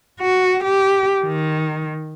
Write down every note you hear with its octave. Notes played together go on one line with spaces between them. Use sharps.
F#4
G4
D#3